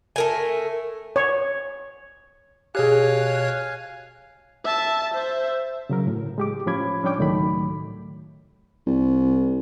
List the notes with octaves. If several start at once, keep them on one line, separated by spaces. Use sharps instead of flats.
A3 A#4 G#5
C#5
B2 G4 G#4 C#5 F5 G#5 F#6
E5 A5
C5 E5
C#3 F#3 A#4
A2
G#3 G4 D6
A2 F3 C#4 B5 D6 G#6
G3 C#4 D4 C#5 G5 D6
C#2 A2 D#3 F#3 A3 B5
C2